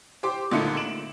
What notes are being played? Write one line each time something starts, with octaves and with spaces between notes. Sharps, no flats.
G4 C5 G5 D6
C#2 A#2 D3 A3 D#4 C#7
D7 E7 F#7